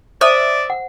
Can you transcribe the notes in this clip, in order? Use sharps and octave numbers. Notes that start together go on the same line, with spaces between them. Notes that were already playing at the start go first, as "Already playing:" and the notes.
C5 D5 E5 D#6
F#5